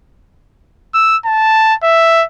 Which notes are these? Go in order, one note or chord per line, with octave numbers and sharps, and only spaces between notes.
E6
A5
E5